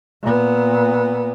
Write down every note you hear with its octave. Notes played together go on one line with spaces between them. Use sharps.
A#2 B3